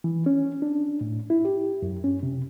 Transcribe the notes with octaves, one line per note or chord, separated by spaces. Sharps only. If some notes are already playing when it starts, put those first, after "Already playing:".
E3
C#4
D4
A2
E4
G4
F#2
C#4
C3